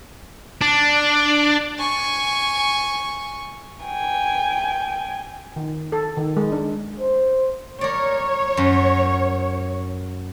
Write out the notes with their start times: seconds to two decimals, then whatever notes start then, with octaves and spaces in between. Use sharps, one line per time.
0.61 D4
1.79 G#5 C#6
3.86 G5 G#5
5.56 D#3
5.92 A4
6.17 D#3
6.37 G#3
6.52 D4
7.00 C5
7.81 A#4 C#5 D5
8.57 F#2